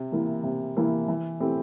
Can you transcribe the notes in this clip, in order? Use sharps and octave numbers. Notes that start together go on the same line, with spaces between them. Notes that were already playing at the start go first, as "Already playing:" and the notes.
Already playing: C3
E3 A#3 E4
C3
E3 A#3 E4
E3
A3 C4 E4 G4